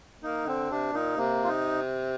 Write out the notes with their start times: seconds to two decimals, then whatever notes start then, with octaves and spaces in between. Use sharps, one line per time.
0.23 A#3 D#4
0.46 D3 C4
0.71 C3 D4
0.93 A#2 D#4
1.16 C3 A#3
1.44 F4
1.48 D#4